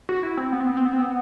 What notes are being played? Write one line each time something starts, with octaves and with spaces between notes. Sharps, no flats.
F#4
E4
C4
B3
C4
B3
C4
B3
C4
B3